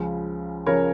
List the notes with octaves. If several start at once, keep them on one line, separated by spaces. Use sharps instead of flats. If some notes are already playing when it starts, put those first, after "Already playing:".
Already playing: C#2 C#3 F3
C#3 F3 A#4 C#5